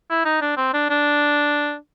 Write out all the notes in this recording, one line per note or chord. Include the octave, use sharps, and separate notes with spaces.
E4
D#4
D4
C4
D4
D4